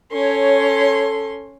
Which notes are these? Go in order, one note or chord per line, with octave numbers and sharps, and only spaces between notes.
C#4 A4 C#5 C6